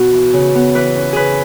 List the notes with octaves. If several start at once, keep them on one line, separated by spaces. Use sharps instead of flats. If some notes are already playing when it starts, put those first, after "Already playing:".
Already playing: B2 B3 F#4
E3
C#3
B3
E3 B4
C#4
C#3 G#4 B4